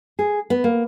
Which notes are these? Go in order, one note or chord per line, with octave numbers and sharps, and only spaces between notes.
G#4
B3
A#3